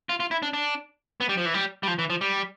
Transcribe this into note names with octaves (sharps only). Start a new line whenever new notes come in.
F4
F4
E4
D4
D4
B3
G3
F3
E3
G3
G3
F3
E3
F3
G3